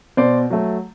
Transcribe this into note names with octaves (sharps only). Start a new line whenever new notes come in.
B2 C5 D5
F#3 A3